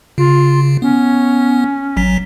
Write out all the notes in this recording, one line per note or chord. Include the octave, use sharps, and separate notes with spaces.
C#3 F4
B3 C#4
A1 F#3 B6